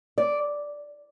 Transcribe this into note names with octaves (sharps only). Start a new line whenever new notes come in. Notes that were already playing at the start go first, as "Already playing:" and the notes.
D5